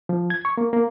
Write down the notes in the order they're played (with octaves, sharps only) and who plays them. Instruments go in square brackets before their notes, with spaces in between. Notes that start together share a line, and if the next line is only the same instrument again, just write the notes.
[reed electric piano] F3
G#6
C#6
A#3
A#3